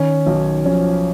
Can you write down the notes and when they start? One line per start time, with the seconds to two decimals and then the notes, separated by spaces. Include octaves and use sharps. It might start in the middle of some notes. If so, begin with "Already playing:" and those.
Already playing: D#3 C#4
0.26 B1
0.65 F3 C#4